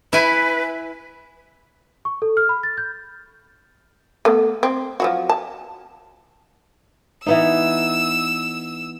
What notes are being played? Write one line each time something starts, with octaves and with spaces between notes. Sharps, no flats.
E4 B4 G#5
C#6
A4
F6
B5
A6
G6
A3 B3
C4
F3 F#3 F#4
A5
E3 B3 D#4 E6